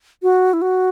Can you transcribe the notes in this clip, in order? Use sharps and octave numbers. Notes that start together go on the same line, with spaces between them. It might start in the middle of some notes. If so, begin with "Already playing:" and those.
F#4
E4
F#4